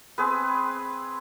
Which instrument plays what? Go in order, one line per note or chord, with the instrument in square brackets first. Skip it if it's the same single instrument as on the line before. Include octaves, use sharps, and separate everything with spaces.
[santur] C4 G#4 B4